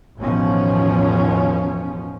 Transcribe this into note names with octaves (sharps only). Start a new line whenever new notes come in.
A1 E2 B2 D#3 F3 C#4